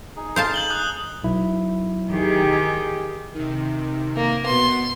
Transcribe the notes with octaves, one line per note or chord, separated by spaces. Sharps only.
D#4 G#4
C5 F5 A5
G6 F#7 G7
D#6 F#6
B1 E4
D#3 G4 G#4
C3 D#3
A#3
B2 B3 C6